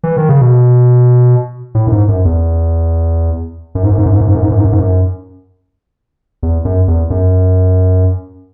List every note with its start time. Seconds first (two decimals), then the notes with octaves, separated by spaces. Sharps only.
0.03 E3
0.17 D#3
0.29 C#3
0.41 B2
1.75 A2
1.87 F#2
1.92 G#2
2.08 F#2
2.25 E2
3.75 F#2
3.83 G#2
3.91 F#2
3.98 G#2
4.06 F#2
4.12 G#2
4.21 F#2
4.27 G#2
4.35 F#2
4.42 G#2
4.51 F#2
4.58 G#2
4.64 F#2
4.72 G#2
4.79 F#2
6.43 E2
6.65 F#2
6.88 E2
7.10 F#2